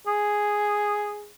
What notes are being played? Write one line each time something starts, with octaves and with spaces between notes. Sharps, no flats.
G#4